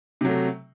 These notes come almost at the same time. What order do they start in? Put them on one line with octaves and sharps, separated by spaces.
C3 F#3 A3